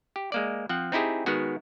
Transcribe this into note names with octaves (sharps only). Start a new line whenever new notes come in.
G4
G#3 A#3 D5
F3 C4 F#5
C4 D#4 E4 G4 G#4
D#3 G#3 B3 F#4